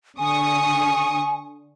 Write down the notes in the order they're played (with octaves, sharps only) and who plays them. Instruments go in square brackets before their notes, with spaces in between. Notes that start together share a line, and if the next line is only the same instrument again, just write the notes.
[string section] D3 C#6 D#6 [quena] G#5